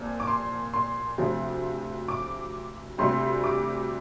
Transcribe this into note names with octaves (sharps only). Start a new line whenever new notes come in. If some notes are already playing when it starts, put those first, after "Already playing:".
Already playing: C2 A#2 F3
D6
C6
C6
D2 C3 F3
D6
D2 C3 G3 C6
D6